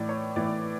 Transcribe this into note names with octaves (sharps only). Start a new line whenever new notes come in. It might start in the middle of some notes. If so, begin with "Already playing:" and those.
Already playing: A2 E3 D5
C#5
A2 E3 D5